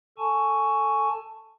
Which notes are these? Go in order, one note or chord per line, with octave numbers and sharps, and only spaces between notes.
A4 G#5 A5 C#6